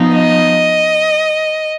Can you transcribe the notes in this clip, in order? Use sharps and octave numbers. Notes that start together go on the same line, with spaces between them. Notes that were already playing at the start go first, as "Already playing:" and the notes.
Already playing: F3 B3 D#4
D#5